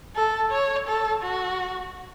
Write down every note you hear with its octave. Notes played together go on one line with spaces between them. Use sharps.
A4
C#5
A4
F#4